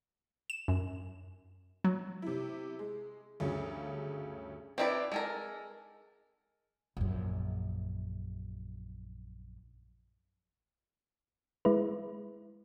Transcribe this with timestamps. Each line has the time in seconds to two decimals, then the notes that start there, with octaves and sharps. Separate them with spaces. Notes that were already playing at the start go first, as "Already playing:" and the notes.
0.50 E7
0.68 F#2
1.84 F#3
2.22 C3 E4
2.79 G#3
3.40 D2 G2 C#3 F#3 C#4
4.78 C4 D#4 E4 B4 D5
5.12 G#3 A4 A#4
6.97 A#1 F#2
11.65 G#3 E4 B4